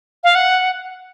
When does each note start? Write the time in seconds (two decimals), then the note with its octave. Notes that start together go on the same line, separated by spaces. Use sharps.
0.24 F5
0.35 F#5